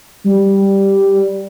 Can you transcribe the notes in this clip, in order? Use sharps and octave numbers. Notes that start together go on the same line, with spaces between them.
G3